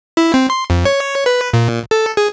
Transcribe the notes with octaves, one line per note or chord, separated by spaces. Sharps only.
E4
C4
C6
F2
C#5
B4
A#2
A4
G#4